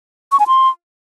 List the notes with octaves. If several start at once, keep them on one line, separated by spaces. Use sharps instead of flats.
C#6
G#5
C6